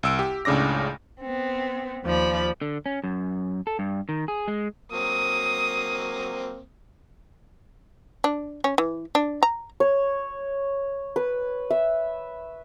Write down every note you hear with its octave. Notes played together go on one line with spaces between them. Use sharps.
C2 E6 D7
G4
C#2 A2 C#3 D4 D6 A#6
B3 C4
D#2 F3 D5 B5
D3
C#4
F#2
A4
G2
D#3
G#4
G#3
F#3 A#3 C4 D#6
D4
C#4
E3
D4
A#5
C#5
B4
E5